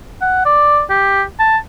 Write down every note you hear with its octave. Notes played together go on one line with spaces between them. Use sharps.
F#5
D5
G4
A5